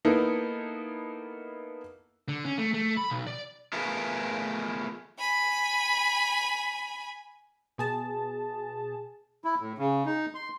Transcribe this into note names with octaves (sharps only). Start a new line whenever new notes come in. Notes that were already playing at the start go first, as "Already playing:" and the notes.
A#3 B3 D#4 E4 A4
D3
C#4
A3
A3
B5
B1
D5
A3 B3 F4 G#4 A#4
G#5 B5
B2 G#4 A5
E4
A2
C#3
D#4
C6